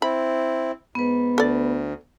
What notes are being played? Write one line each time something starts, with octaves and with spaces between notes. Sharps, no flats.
C4 E4 B5
G#2 B3 B4
D2 A4 D5